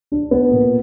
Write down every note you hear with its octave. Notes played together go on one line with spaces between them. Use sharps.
D4
B3
A#2